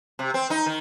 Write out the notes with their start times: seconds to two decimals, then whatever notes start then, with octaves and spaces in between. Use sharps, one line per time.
0.19 C3
0.34 C4
0.50 D#4
0.66 D#3